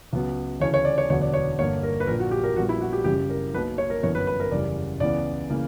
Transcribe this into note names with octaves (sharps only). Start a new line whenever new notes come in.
C#2 C#3 F#3 B3
D2 C#3 E3 C#5
C#5
D5
C#5
E1 D2 D3 F#3 B3 C#5
D5
C#5
G1 G2 D3 A#3 C#5
A#4
B4
A#1 A#2 A#3 A#4
F#4
G4
A#4
A#1 A#2 G3 B3 F#4
E4
F#4
G4
F#1 F#2 C#3 G3 G4
A#4
B1 B2 A#3 B4
C#5
A#4
G1 F#2 E3 B3 C#5
B4
B4
A#4
F#1 E2 C#3 E3 G3 D5
C#2 C#3 E3 B3 D5
C#3 E3 A#3